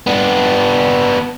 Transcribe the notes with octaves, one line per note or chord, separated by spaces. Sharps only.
B3 D4